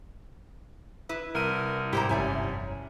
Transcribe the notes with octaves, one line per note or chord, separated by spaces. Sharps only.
E4 B4
C2 A#4 D#7
G#2 E4 G4 C5 A#5
G1 F2 C#4 D5 E5 G#5